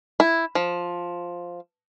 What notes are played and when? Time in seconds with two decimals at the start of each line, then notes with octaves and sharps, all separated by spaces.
0.20 E4
0.55 F3